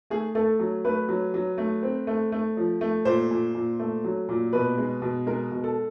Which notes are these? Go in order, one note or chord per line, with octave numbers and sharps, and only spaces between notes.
A3 G#4
A3 A4
F#3
A3 B4
F#3
F#3
A3
C4
A3
A3
F3
A3
A#2 C5
A#2
A#2
A3
F#3
A#2
B2 B4
G#3
B2
G#3 A#4
B2
A4